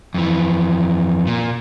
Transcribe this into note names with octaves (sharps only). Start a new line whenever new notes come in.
F2 E3
A#2